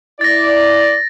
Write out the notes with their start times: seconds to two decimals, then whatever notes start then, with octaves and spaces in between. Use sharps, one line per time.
0.21 E4 D5 A6 A#6